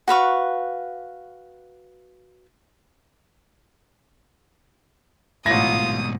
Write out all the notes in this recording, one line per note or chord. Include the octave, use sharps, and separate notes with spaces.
F#4 B4 F5 C#6
A1 G#2 B2 F4 D#6 A#6